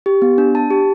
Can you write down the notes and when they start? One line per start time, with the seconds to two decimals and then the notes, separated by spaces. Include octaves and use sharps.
0.06 G4
0.22 B3
0.38 D4
0.55 A5
0.71 G4